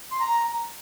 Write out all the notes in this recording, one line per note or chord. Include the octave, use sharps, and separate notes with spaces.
C6
A#5